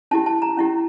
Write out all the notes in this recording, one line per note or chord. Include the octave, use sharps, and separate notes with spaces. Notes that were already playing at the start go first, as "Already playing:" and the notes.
C#4 E4 G4 A5
A5
A#5
C#4 E4 G4